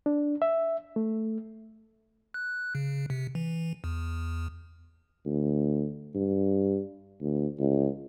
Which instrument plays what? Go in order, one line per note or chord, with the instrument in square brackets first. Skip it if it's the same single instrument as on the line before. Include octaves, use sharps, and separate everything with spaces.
[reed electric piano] D4
E5
A3
[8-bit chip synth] F#6
C#3
C3
E3
E2
[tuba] D2
G2
D2
C#2